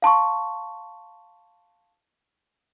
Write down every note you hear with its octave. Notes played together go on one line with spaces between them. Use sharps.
F5 A5 C6 C#6